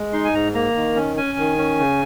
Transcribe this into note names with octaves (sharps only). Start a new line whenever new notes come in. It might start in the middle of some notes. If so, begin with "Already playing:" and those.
Already playing: G#3
D#4 C6
G#5
G#2 A#5
A#3 A#5
D#3
C#4
C#4 G#5
D#3
C#4
C#3